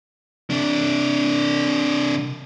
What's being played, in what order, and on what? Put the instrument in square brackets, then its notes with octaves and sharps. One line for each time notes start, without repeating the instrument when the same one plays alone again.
[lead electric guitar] C3 D4